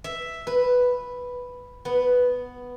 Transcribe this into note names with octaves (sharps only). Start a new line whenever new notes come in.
E5
B4
B3